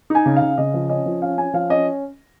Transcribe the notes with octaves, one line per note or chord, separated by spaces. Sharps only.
D#4 G#5
C#3
F5
C#3
C#3 D#5
F3
C#4 D#5
F3
C#4 F5
C#4 G#5
F3 F5
C#4 D#5